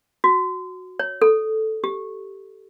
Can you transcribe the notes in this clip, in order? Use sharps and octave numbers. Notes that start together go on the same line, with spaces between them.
F#4
C#5
A4
G4